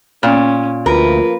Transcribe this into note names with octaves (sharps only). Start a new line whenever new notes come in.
A#2 C#4
D2 F3 A#3 F4 A#4 B4